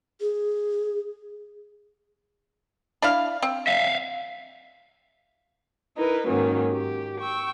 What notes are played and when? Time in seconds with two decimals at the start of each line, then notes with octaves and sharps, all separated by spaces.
0.21 G#4
3.02 D4 E4 F5
3.42 C4
3.67 E5 F5
5.96 D#4 E4 A#4 B4
6.28 G#2 D#3 F#3 A#3 C#4
6.70 G4
7.19 G5 C#6 E6